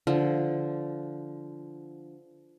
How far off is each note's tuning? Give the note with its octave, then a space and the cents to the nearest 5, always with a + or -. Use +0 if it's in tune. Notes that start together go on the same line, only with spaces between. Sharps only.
D3 -10 F3 -20